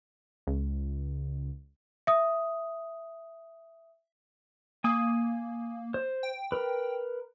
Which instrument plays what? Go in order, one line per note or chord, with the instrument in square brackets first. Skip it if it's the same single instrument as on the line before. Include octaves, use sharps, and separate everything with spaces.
[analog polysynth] C#2
[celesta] E5 D#6
[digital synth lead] A#3 [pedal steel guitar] G#5 D#6
[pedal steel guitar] C5
[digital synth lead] G5
[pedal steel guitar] A#4 B4